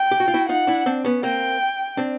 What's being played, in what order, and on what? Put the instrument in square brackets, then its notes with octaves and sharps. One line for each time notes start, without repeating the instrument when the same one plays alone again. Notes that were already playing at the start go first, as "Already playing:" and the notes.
Already playing: [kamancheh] G5
[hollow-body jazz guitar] G4
F#4
F4
E4 F#4
[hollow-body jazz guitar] D#4 F4 [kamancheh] F#5
[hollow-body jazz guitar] D4 E4
C4 D4
B3 C#4
[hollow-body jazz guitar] A#3 C4 [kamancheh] G5
[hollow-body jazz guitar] C4 D4